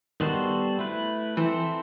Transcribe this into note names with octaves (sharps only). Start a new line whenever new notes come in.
D#3 G3 B3 F#4 A4 C5
A3 E4 B4
E3 C4 E4 A4 C5